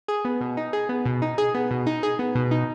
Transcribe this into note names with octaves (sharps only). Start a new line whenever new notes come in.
G#4
B3
B2
D#4
G#4
B3
B2
D#4
G#4
B3
B2
D#4
G#4
B3
B2
D#4